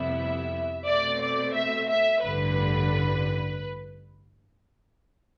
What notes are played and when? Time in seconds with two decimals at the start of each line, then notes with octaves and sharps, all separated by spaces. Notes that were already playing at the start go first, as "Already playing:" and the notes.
Already playing: F2 C3 G3 B3 E4 E5
0.86 B2 A3 C4 D5
1.21 D5
1.54 E5
1.88 E5
2.22 A1 G2 D3 B4